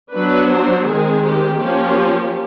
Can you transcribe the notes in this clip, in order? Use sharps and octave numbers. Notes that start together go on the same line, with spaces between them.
F#3 B3 D4 B4
C5
D#3 G#3 C4 G#4
G4
F3 A#3 C#4 G4